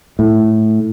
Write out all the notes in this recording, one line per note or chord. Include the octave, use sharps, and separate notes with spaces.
A2